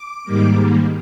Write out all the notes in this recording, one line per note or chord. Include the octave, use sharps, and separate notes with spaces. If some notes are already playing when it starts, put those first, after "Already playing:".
Already playing: D6
G#2 D#3 G3 A#3